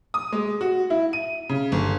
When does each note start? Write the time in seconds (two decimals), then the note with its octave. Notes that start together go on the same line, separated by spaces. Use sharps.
0.14 D#6
0.32 G#3
0.61 F#4
0.90 E4
1.13 D#7
1.49 C#3
1.72 G1